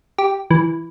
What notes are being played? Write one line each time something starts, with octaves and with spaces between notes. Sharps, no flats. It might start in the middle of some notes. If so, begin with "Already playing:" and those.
G4
E3